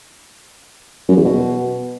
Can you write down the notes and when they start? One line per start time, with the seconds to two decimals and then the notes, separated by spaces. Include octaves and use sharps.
1.09 F#2
1.17 E2
1.25 B2